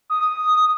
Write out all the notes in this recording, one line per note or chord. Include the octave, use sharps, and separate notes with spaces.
D#6